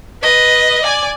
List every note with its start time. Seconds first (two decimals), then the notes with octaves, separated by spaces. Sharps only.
0.23 B4 D#5
0.84 D5 G#5